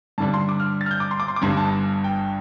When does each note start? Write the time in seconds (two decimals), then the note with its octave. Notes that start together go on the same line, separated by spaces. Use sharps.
0.18 G2 D3 G3 D4 A5
0.34 C6
0.49 D6
0.60 F6
0.81 A6
0.86 F6
0.91 G6
1.00 D6
1.11 C6
1.20 D6
1.28 C6
1.36 D6
1.42 G1 G2 G3 D4 C6
1.57 A5
2.04 G5